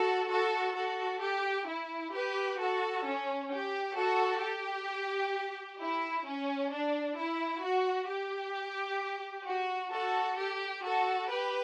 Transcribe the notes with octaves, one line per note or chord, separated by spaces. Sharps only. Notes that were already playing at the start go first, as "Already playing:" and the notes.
Already playing: F#4 A4
F#4 A4
F#4 A4
G4
E4
G4 B4
F#4 A4
C#4
G4
F#4 A4
G4
E4
C#4
D4
E4
F#4
G4
F#4
F#4 A4
G4
F#4 A4
G4 B4